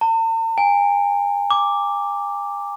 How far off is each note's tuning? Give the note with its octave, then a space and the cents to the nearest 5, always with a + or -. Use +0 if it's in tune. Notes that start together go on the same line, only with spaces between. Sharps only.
A5 +45
G#5 -40
D6 +0